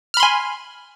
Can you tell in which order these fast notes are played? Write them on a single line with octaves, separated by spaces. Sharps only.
F6 B5 C6 G#5